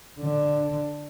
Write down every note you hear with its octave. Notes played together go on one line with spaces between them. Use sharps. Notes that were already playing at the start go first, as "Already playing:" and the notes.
D3 D4